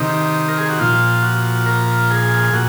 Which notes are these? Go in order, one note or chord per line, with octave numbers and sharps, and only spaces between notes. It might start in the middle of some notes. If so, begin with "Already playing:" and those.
Already playing: C3 D#3 D#4
A#4
G#4
F#4
A#2 F3 F4
F#4
A#4
G#4
A#2 F#4